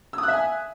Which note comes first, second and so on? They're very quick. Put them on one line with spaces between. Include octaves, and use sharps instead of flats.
E6 D#6 F#6 E5 G#5